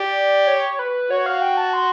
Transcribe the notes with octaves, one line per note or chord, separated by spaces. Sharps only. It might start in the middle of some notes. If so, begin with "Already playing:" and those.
Already playing: G4 D5
C#5
B4
F#4 C#5
F5
G5
A5
C6